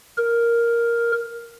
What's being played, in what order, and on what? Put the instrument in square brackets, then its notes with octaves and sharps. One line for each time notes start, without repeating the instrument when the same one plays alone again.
[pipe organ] A#4